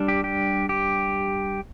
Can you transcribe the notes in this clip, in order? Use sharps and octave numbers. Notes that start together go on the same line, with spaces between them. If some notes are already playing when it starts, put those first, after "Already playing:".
Already playing: G3 D4
G4
G4
G4